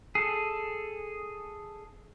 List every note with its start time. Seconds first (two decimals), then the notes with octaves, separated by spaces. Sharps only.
0.15 G#4 A4